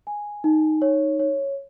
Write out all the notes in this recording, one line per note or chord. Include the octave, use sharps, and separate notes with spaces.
G#5
D#4
C#5
C#5